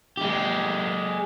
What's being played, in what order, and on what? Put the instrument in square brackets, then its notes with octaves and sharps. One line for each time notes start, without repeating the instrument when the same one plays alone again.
[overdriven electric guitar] G#3 G4